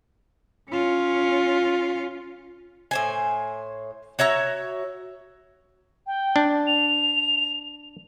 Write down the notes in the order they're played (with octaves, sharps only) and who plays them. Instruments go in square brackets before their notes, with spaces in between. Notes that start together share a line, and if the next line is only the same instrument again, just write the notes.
[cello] C#4 F4
[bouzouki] A2 C5 G#5
F#4 C#5 E5 A#5
[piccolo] G5
[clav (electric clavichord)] D4
[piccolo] F7